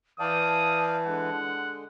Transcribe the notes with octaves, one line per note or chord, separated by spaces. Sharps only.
E3 D5 F5 G5 A5 D#6
D3 G#3 F#5